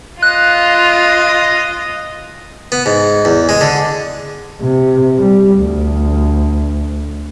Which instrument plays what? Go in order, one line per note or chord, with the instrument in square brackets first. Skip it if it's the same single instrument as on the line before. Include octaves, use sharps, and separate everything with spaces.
[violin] F4 [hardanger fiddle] D#5 [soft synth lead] F#6
[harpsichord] B3
G#2
E2
G#3
D3
[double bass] C3
G3
D2